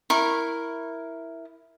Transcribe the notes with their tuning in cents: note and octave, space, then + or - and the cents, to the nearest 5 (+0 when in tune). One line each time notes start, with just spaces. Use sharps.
E4 +0 A#4 +0 C#6 -30